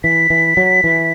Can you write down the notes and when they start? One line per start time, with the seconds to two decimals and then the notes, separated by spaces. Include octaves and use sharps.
0.04 E3 B6
0.30 E3
0.57 F#3
0.84 E3